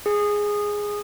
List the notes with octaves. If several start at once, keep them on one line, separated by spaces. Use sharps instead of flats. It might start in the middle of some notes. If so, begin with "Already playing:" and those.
G#4